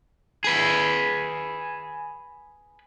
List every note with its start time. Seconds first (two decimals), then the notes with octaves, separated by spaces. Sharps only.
0.44 G#4 B4